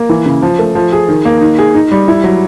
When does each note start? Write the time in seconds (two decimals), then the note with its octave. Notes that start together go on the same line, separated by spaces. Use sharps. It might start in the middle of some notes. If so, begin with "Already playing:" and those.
Already playing: A#3
0.09 E3
0.26 C#3
0.42 F3
0.59 A3
0.75 F3
0.93 G#4
1.08 D#3
1.25 A#3
1.41 D#4
1.58 G#4
1.75 D#4
1.92 G3
2.08 E4
2.24 F#3